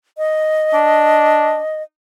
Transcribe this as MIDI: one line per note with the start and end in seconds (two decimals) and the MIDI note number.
0.18 1.82 75
0.74 1.58 62